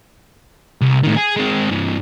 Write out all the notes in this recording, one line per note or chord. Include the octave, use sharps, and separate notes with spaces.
C2
A2 D#3
G#4
G#3 C4
G2 E3